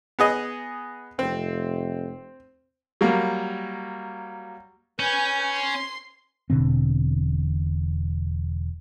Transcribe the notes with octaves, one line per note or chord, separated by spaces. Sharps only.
B3 G#4 D#5
F1 C4
F#3 G3 A#3
C#4 B4 G#5 G6
C6
E1 B2 D3 C4